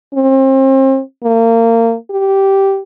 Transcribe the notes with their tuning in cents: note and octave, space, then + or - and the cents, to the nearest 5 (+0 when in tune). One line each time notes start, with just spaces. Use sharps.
C4 +35
A#3 -30
G4 -10